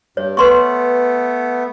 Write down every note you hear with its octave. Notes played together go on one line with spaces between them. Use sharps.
G2 C#5
A3 B3 B4 C6 C#6